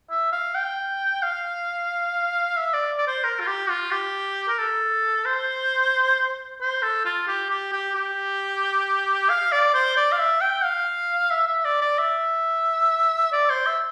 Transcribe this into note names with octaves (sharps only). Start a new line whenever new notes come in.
E5
F5
G5
F5
E5
D5
D5
C5
A#4
F4
G4
F4
G4
A#4
A4
C5
C5
A4
F4
G4
G4
G4
G4
F5
D5
C5
D5
F5
E5
G5
F5
E5
E5
D5
D5
E5
D5
C5
E5